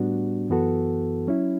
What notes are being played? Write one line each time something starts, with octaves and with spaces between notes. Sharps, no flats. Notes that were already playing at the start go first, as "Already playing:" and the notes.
Already playing: A2 G3 B3 D4 F#4
F#2 E3 B3 F#4 A4
F#3 C#4 E4